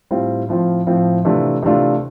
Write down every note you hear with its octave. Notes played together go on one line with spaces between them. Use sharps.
A2 G3 C4 F4
A2 F3 C4 F4
A2 F3 C4 F4
C3 E3 A3 D4 F4
C3 E3 A3 D4 F4